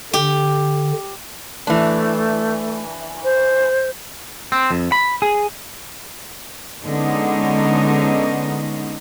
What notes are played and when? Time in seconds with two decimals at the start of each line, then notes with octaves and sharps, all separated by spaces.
0.13 D3 G4
1.67 E3 A3 D4
3.24 C5
4.52 C4
4.71 F2
4.92 B5
5.22 G#4
6.85 D3 G#3 B3 C#4 D#4